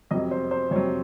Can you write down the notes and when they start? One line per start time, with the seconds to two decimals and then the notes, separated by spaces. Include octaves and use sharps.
0.11 F2 C3 F#3 D#5
0.31 C5
0.51 C5
0.71 F2 C3 F#3 C#5